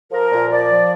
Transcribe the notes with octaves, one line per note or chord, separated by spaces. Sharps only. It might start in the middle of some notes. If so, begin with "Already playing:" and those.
F3 A#4
A#2
F3 D5
F3